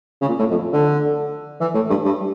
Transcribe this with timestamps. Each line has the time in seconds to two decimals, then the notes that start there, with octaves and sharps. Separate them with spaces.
0.22 C#3
0.28 A#2
0.39 A2
0.51 F2
0.73 D3
1.61 E3
1.74 A2
1.90 G2
2.05 G2